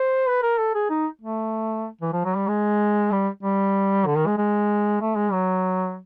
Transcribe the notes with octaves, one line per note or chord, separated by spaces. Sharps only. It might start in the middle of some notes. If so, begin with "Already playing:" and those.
Already playing: C5
B4
A#4
A4
G#4
D#4
A3
E3
F3
F#3
G3
G#3
G3
G3
D3
D#3
G#3
G#3
A3
G#3
F#3